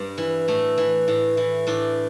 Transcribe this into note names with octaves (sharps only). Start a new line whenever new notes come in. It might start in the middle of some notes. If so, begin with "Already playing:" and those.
Already playing: G2 G3
E3
A2 A3
E3
A2
E3
A2 D4